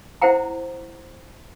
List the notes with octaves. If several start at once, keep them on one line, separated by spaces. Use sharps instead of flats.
E4 C5 F#5 G5 A#5